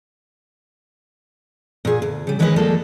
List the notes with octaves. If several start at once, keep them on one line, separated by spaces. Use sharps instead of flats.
A#2 G#4
D2
C#3 G3
D#3 E3 G#3 C#4 B4 D#5
F3 G3 G#3 A#3 A4